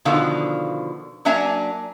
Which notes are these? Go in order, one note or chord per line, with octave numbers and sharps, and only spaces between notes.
B2 D3 D#3 F3 F5
F#3 A#3 D4 E5 G#5 A#5